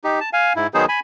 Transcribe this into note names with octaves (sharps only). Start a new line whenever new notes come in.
D#4 G4
A5
F5 G#5
G#2 E4
D#3 F#3 B3 D#4 G#4 C5
G#5 B5